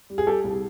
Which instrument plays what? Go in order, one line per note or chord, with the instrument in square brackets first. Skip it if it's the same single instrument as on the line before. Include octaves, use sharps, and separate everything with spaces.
[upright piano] G3
G#4
G3 G4 A4
C2